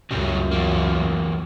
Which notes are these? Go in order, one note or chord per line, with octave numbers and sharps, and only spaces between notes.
C#2 F#2 C#3 F#3 G3
E2 G#2 A#3